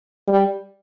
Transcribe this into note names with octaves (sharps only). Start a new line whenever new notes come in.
G3